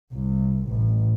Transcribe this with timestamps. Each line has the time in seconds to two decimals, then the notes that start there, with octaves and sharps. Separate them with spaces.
0.16 C2
0.68 A1